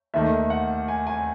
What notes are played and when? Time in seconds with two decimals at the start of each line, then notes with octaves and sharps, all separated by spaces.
0.14 D#2 D#3 A3 E5
0.50 F#5
0.88 G#5
1.07 G#5